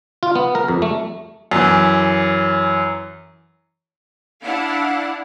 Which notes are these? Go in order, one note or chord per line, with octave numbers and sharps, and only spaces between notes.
F4
B3
A#4
F2
A3
F#2 E3
D4 E4 F5 F#5